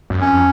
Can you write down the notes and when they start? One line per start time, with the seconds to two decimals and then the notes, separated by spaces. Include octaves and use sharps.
0.10 F#2
0.22 F2 C#4